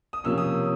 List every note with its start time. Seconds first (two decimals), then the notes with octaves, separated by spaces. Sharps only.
0.13 D#6
0.24 C3 F3 A#3 C#4 E6
0.38 D#6